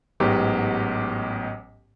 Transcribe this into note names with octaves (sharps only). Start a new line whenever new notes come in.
A1 G#2 F#3 B3 G4